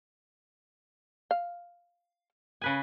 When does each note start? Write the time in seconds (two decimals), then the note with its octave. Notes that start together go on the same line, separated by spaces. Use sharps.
1.31 F5
2.61 C#3 B4 G#5